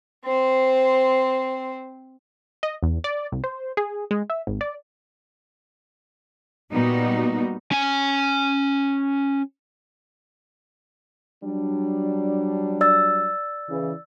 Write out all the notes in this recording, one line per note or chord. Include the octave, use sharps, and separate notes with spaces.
C4 C5
D#5
E2
D5
C2
C5
G#4
G#3
E5
G#1
D5
A#2 G3 B3 D#4 F#4
C#4 G#5
F#3 G3 D4
D5 E6 A6
C#3 E3